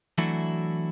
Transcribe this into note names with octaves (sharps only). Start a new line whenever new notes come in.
E3 F#3 A3 D4 E4 F#4